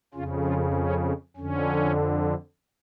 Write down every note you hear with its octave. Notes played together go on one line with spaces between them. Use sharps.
F2 C#3 C#4 F4
C#4 F4
C#4
F2 D3 C#4